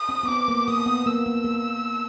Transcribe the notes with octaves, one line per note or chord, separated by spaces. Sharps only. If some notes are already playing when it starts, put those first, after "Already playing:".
Already playing: D#6
C4
B3
C4 D6
A#3
A#3 D#6
B3
A#3 E6
A#3
A#3